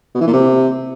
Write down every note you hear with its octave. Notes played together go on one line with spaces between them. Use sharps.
B2
E3
A#2
C3